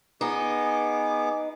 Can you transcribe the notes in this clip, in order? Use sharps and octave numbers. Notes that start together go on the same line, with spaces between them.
B3 D#4 G#4 D6